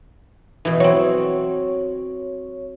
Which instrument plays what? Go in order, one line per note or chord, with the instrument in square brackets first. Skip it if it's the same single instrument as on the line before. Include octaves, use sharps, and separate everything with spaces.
[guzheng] B2 E3
[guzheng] F#3 C4 [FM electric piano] C#5